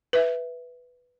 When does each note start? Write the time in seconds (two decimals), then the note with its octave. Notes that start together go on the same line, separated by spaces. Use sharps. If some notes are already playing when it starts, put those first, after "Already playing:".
0.13 B4 E5